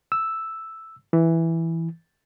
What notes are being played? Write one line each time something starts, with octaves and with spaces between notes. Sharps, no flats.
E6
E3